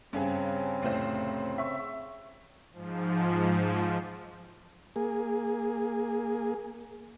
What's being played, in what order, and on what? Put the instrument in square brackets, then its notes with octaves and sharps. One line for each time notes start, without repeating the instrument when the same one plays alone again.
[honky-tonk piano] G2 C#4 G#4 [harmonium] C#3 C4
[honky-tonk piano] F1 A2 C5
E5 C#6
[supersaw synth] G#2 F3
[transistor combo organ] A#3 G#4